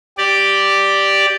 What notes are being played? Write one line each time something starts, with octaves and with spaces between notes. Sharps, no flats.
G4 D5